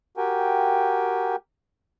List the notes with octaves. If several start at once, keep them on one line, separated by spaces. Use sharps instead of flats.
F#4 G4 A#4 G5 G#5